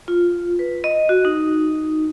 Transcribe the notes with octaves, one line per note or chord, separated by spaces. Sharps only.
F4
B4
D#5
F#4
D#4